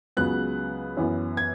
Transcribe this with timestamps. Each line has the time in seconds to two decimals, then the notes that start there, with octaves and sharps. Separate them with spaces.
0.17 C#2 C#3 F#3 B3 F#6
0.97 F#2 E3 B3
1.37 G#6